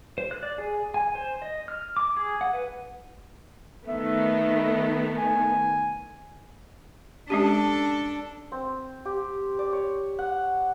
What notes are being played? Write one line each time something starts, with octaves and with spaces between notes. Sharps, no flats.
C5
F#6
D5
G#4
G#5
C5
D#5
F6
D6
G#4
F#5
B4
D#3 A3 B3 E5
G#5
G#3 C#4 D4 G4 A4
C4
G4
D5
C#5
F#5